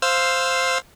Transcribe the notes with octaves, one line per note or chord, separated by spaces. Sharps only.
C5 F5 E6